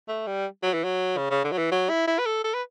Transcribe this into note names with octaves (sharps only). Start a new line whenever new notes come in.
A3
G3
F#3
E3
F#3
C#3
C#3
D3
F#3
E3
F#3
E4
E4
B4
A4
A4
B4